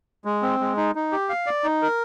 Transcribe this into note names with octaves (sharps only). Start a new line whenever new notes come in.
G#3
C4
G#3
D#4
D#4
G4
F5
D5
D#4
A#4